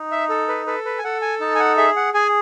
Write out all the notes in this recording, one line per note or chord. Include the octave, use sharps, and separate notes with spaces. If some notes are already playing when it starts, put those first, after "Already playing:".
Already playing: D#4
E5
A4
B4
A4 B4
B4
G#5
A4 F#5
G#5
D#4 A5
G#5
F#5
G#4 E5
F#5
G#4 G#5